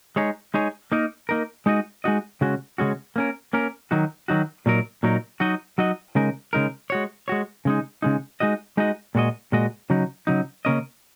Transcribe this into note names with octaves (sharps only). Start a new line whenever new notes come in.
G#3 D#4 G#4 C#5
G#3 D#4 G#4 C#5
A#3 D#4 A#4
A#3 D#4 A#4
G#3 D#4 F#4 D#5
G#3 D#4 F#4 D#5
C#3 G#3 C#4 F#4
C#3 G#3 C#4 F#4
A#3 C#4 A#4
A#3 C#4 A#4
D#3 F#3 D#4 F#4
D#3 F#3 D#4 F#4
A#2 F#3 D#4 A#4
A#2 F#3 D#4 A#4
F#3 D#4 F#4 D#5
F#3 D#4 F#4 D#5
C#3 G#3 D#4 A#4
C#3 G#3 D#4 A#4
G#3 F#4 C#5
G#3 F#4 C#5
C#3 G#3 D#4
C#3 G#3 D#4
G#3 D#4 F#4 D#5
G#3 D#4 F#4 D#5
A#2 G#3 F#4 D#5
A#2 G#3 F#4 D#5
C#3 F#3 D#4
C#3 F#3 D#4
C#3 A#3 C#4 A#4 D#5